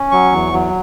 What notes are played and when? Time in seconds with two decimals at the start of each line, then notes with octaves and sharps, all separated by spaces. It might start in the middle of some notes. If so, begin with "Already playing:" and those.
Already playing: C#4
0.11 F#3 C#6
0.32 E2
0.53 F#3